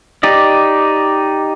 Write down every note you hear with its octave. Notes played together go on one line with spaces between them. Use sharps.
D#4 G4 D5 D#5